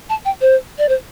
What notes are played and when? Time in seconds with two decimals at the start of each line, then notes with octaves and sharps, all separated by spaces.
0.09 A5
0.25 G5
0.41 C5
0.78 D5
0.89 C5